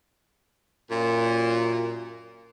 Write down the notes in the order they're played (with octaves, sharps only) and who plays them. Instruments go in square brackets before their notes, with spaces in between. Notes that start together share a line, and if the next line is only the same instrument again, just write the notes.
[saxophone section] F#2 A#2